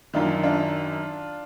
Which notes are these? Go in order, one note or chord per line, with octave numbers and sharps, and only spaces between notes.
F#2 D#3 D4 F4
D4 F4